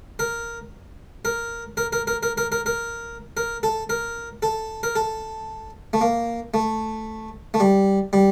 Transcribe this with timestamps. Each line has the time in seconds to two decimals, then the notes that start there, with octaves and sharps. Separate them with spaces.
0.19 A#4
1.25 A#4
1.77 A#4
1.93 A#4
2.07 A#4
2.23 A#4
2.38 A#4
2.52 A#4
2.66 A#4
3.37 A#4
3.63 A4
3.90 A#4
4.42 A4
4.83 A#4
4.96 A4
5.93 A3
6.01 A#3
6.54 A3
7.54 A3
7.60 G3
8.13 G3